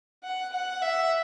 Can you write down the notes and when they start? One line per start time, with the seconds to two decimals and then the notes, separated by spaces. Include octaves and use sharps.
0.24 F#5
0.53 F#5
0.82 E5